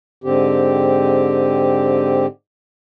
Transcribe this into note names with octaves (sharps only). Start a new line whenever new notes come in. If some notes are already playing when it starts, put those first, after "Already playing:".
G#2 D3 C4 G4